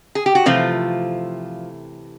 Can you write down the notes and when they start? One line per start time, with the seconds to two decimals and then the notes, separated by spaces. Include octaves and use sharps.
0.15 G#4
0.26 G4
0.35 F#4
0.46 C3 E3 F3 A3 F4